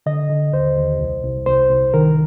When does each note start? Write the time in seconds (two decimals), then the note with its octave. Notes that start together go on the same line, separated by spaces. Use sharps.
0.06 D3 D#5
0.29 D3
0.53 D#2 C5
0.77 D#2
0.99 C2
1.23 C2
1.46 C2 C5
1.69 C2
1.94 D#3 A#4